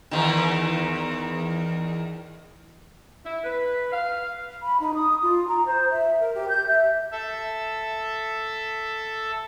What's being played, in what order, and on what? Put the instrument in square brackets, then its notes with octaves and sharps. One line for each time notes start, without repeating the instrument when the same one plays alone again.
[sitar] E2 D#3
[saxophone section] E4
B4
F5
[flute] B5
D#4
D#6
F4
A#5
C5
E5
A#4
G4
G6
E5
[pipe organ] A4 E5